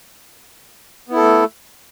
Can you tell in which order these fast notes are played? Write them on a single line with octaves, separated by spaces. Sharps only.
B3 E4 A4 A3